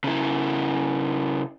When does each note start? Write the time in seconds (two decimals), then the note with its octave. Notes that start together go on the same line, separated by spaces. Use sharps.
0.04 C#3 E4